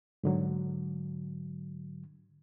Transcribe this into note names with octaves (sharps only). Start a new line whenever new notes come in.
G#2 D3 F#3